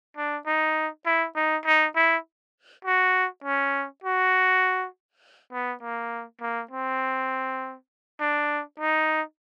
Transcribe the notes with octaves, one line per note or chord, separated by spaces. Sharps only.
D4
D#4
E4
D#4
D#4
E4
F#4
C#4
F#4
B3
A#3
A#3
C4
D4
D#4